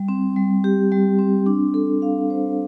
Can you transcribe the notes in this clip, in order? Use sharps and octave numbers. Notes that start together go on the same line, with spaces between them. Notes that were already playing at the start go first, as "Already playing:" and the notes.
Already playing: G3
C4
G3
G4
G3
C4
D4
A4
F5
C5